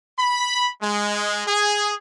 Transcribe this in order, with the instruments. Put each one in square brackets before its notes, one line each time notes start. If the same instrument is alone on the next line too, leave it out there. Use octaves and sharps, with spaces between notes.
[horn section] B5
G#3
G#4